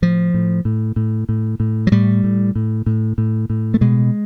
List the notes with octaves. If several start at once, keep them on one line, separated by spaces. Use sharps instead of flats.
A2 F3
A2
A2
A2
A2
A2
F#3
A2 G3
A2
A2
A2
A2
A2
A3
B2 G#3